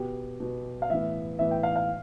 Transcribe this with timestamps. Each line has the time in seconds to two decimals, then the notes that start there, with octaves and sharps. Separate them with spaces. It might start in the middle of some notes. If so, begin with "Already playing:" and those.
Already playing: B2 B3 G4
0.40 B2 B3
0.82 F5
0.90 A2 E3 B3 E5
1.39 A2 E3 B3 E5
1.51 G5
1.63 F5
1.76 F5